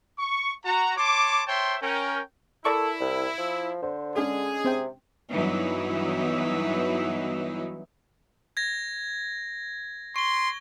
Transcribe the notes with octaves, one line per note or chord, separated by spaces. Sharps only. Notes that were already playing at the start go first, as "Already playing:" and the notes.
C#6
F#4 A#5
C#5 A5 C6 D6
C5 C#5 E5 G5 A5 C6
C#4 A#4 G5
E4 A4 A#4 D5 C#6
C2
F3
D3 C5
G#3 C#4 D4 G#4
C3 C4 C5 G5
G2 E3 F#3 B3 D#4 E4
G#6 A#6
C6 C#6 G7